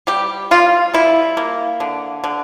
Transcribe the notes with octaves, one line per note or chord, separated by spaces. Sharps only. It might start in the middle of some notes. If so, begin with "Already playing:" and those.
G3 G4
G3 F4
G3 E4
A#3
D3
D3